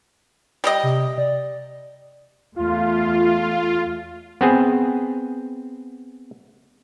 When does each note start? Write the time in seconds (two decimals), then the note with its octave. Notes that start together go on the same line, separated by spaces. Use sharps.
0.64 G3 G4 D#5
0.83 C3
1.18 D5
2.56 E2 A3 F4
4.41 B3 C4 G#4